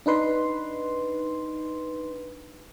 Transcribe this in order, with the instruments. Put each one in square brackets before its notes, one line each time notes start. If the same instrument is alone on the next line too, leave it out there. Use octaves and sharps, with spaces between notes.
[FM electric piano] D4 D#4 B4 C6